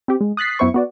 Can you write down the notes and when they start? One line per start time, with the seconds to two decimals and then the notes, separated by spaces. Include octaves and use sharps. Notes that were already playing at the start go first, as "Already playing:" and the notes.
0.08 C4 G4
0.21 G#3
0.37 D#6 F#6 A6 B6 C7
0.59 F#2 B3 E4 C5 C#6
0.74 B3 F#4 D5